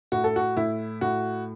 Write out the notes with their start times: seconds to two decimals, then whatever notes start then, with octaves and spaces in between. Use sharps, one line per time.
0.12 A2 F#4
0.24 A4
0.36 F#4
0.57 A2 E4
1.01 A2 F#4